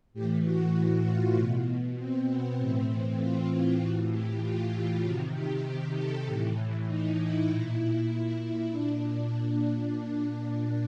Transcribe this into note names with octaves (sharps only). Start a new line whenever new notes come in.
A2 E3 G4
F#4
F#4
F4
B2
C4
B3
A2 E3 C4
F4
A2 E3 F#4
G4
F4
F4
C3 D#3 F#4
G4
A4
A2 E3
D#4
E4
A#2
A#2 D4